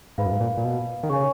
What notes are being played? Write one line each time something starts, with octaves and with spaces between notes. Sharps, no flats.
G#2 B4 F5 B5
F#2
G#2
A#2
A#2
B2
D#3
C#3 C#5 G#5 C#6